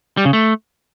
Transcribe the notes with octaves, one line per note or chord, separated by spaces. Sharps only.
G3
C#3
A3